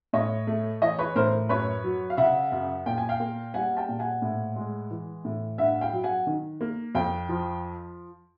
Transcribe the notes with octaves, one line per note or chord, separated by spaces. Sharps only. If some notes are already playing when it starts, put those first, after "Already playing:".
A2 C#5 D#5
A3
E3 C#5 D#5
B4 C#5
A2 A#4 C5
F#2 B4 C#5
F#3
F5
C#3 E5 F#5
F#2
A#2 G5
G#5
F5 G5
A#3
G3 F#5 G#5
G5 A5
A#2
F#5 G#5
A2
G#3
E3
A2
G2 E5 F#5
F5 G5
F#3
F#5 G#5
D#3
A#3
F2 F5 G5
F3